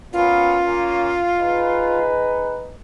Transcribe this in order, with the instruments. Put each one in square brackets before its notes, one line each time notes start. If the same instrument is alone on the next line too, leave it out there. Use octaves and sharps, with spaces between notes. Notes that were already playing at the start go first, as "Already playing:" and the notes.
[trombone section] A#3 B3 C#4 [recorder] F4
[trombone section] A#3 C#4
D#4 G#4 B4